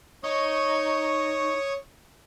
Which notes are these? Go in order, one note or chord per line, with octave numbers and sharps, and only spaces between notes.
D#4 C#5 C#6 D#6